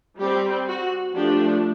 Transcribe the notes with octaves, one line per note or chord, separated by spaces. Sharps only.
G3 C4 G4
F#4
F3 A3 D4 G4